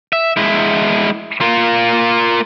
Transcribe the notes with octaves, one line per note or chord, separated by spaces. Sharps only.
E5
G#3 E4
A#3 F4